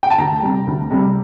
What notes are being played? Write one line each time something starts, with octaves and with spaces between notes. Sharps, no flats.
G5
A5
D2 A#5
C3 G3
D2
C3 G3